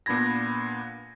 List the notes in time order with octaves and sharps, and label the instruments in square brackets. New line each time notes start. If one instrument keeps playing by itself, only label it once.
[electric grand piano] A#2 B3 D4 B5 G#6 A#6